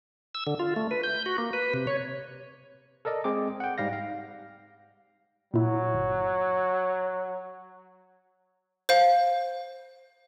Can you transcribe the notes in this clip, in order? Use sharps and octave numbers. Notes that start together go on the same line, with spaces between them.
E6
D3
F4
A3
B4
G6
F#4
A#3
B4
C3
C#5
A4 A#4 D5 D#5
G#3 C4 G#4 D6
F#5 G5
G#2 G3 F5 A#6
F5
A#2 F#3 E4
G1
C5 F5